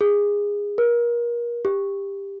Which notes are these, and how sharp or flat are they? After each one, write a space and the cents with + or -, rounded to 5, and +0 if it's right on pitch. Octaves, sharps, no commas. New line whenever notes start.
G#4 -20
A#4 +30
G4 +15